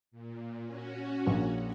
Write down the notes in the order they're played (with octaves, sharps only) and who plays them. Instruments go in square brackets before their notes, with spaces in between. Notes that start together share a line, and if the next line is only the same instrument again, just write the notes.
[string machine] A#2
C#4 F#4
[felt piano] A#1 A#3